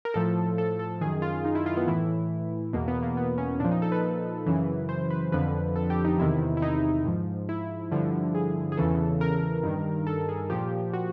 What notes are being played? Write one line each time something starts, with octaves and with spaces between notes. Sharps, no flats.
A#4
A2 F3 A4
A4
A4
F#2 D#3 G#4
F4
D#4
E4
F4
B3
A2 E3 E4
E2 B2 A#3
B3
A#3
B3
C#4
A#2 F3 D4
D#4
A4
B4
F#2 C#3 E3
C5
B4
F2 D3 F3 B4
A4
G4
D#4
E2 C3 D#3 E4
E4
D#4
G#2 F3
E4
G2 D3 F3
G#4
G#4
E2 C#3 E3 A4
A#4
G2 D#3
A4
G#4
A#2 F3 G4
F#4